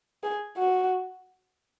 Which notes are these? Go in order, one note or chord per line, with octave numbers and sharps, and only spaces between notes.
G#4
F#4